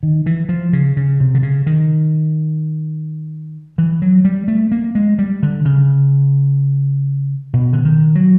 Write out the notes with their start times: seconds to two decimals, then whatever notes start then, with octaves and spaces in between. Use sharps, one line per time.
0.03 D#3
0.26 E3
0.49 F3
0.73 C#3
0.97 C#3
1.20 C3
1.34 D3
1.43 C#3
1.66 D#3
3.78 E3
4.02 F#3
4.25 G3
4.48 A3
4.72 A#3
4.95 G#3
5.18 G3
5.43 D3
5.65 C#3
7.53 B2
7.73 D3
7.85 D#3
8.15 F#3